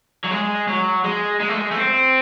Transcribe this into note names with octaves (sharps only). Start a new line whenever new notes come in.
F#3
G#3
F#3
G#3
G#3
A3
G#3
A3
C4